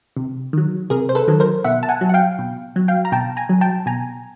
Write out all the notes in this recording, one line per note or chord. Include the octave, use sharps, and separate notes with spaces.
C3
D#3 F#3
C3 G#4 A#4
C5
A4 B4
D#3 F#3
A#4 C5
B2 E5 F#5
A5
F#5 G#5
F#3
F#5
F5 G5
B2
F#3
F5 G5
A#5
B2 G5 A5
G#5 A#5
F#3
G5 A5
B2 G#5 A#5